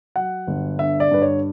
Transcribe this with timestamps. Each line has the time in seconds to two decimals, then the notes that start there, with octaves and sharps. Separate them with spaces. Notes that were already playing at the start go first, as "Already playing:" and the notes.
0.16 F#3 F#5
0.47 G1
0.79 D3 E5
1.00 D5
1.11 G2 B4
1.22 C#5